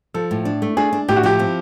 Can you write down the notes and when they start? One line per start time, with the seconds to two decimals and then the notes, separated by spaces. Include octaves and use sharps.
0.14 F3 A4
0.31 A2
0.45 D4
0.62 A3
0.77 D4 G#4
0.93 D4
1.08 A2 G4
1.16 F#4
1.23 F3 G4
1.39 C4